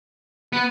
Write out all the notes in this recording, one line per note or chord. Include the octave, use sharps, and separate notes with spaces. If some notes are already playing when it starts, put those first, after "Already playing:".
B3